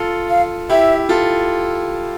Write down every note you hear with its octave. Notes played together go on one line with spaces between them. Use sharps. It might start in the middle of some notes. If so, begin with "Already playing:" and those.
Already playing: F4 A4
F5
E4 G4 E5
F4 A4